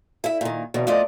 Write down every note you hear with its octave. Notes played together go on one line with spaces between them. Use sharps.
E4 E5
A#2 D#3
D#2 B2 D3 E3
F2 A3 F4 D5 D#5